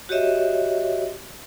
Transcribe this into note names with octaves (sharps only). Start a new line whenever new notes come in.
F#4 G4 C#5 D#5 E5